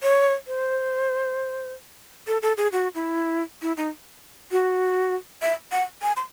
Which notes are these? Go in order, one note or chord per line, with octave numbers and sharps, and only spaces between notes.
C#5
C5
A4
A4
G#4
F#4
E4
E4
D#4
F#4
E5
F#5
G#5
C6